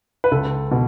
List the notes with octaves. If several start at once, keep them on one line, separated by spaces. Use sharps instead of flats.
B4
C#2 A4
B2